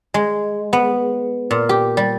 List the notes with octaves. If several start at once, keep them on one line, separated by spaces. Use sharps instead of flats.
G#3
B3
A#2
G4
G3